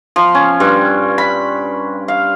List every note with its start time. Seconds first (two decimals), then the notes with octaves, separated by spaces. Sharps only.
0.16 F3
0.35 C#4
0.60 G2
1.18 B5
2.08 F5